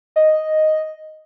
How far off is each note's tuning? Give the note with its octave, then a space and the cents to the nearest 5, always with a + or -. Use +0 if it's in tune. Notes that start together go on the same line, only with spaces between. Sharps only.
D#5 +0